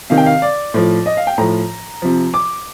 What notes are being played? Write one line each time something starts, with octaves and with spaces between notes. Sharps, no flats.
C3 D#3 F5
G5
F5
D5
A2 F3
D#5
F5
G5
A2 F3 A#5
C3 F3
D6